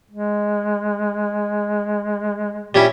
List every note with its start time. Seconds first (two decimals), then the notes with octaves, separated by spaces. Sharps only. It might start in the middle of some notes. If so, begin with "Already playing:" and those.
0.11 G#3
2.75 A#2 G3 C#4 E4